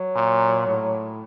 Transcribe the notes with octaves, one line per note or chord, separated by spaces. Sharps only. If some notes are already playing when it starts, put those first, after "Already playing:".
Already playing: F#3
A#2
A2